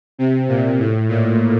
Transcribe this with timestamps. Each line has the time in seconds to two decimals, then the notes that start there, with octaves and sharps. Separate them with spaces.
0.19 C3
0.48 A#2
0.79 A2
1.09 A#2